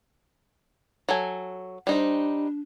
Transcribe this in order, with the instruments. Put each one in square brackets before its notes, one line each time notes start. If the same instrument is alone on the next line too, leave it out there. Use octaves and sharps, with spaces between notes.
[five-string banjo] F#3 A4 G#5
[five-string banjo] G3 D#4 C5 [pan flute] D4